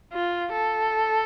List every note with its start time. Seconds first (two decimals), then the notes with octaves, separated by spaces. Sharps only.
0.13 F4
0.52 A4